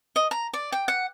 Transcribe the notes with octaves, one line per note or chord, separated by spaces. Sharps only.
D#5
A#5
D5
G5
F#5